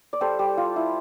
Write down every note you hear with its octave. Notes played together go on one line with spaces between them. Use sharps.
D5
G3 A4 C5
G3
F4
E4